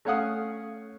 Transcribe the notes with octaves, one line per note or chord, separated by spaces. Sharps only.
A3 C#4 C#5 F5 F#5 D#6